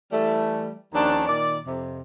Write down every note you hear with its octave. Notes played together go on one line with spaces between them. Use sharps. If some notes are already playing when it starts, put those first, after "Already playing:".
E3 G3 A3
D#2 F3 C#4 D4
A#2 D#3 D5
F2 C3